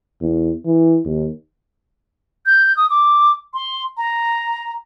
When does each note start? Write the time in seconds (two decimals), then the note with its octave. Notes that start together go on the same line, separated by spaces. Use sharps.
0.21 E2
0.65 E3
1.05 D#2
2.46 G6
2.77 D#6
2.90 D6
3.54 C6
3.97 A#5